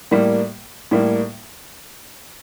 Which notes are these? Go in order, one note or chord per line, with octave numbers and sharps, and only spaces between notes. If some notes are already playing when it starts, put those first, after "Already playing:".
A2 G3 A#3
A2 G3 A#3